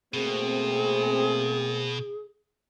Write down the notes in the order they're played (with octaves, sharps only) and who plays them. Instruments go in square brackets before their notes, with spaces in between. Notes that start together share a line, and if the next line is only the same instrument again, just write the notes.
[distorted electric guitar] B2 [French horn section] A3 A#3 C4 [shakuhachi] G#4